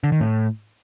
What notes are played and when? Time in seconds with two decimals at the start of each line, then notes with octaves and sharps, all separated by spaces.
0.04 D3
0.12 D#3
0.21 A2